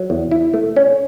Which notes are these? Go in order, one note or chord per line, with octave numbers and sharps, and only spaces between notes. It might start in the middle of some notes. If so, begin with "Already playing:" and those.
Already playing: F#3
E2
E4
A3
C#4